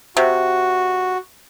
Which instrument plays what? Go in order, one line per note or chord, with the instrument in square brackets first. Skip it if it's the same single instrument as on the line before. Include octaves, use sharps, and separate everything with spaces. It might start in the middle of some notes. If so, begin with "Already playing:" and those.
[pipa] C3 [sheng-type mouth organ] F#4